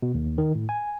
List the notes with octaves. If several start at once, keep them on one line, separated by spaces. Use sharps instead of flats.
B2
D#2
D#3
A2
G#5